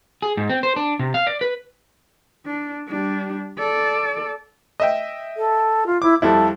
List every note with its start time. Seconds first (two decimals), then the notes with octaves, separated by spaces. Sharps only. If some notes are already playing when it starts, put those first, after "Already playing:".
0.22 G#4
0.37 G#2
0.50 C4
0.63 C5
0.76 D4
0.99 C3
1.14 F5
1.27 D5
1.41 B4
2.46 D4
2.88 G3 D4
3.58 A4 D5
4.80 D#5 E5 G5
5.36 A4
5.86 F4
6.02 E4 D6
6.22 F2 G3 E4 A4